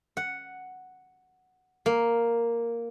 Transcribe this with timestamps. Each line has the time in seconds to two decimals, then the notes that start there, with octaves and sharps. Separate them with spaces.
0.17 F#5
1.86 A#3